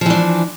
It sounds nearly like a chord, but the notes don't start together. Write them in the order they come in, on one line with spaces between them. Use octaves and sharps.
F3 E3 D4